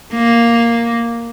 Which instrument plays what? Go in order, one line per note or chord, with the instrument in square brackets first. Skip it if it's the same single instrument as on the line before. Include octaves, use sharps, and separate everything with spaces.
[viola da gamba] A#3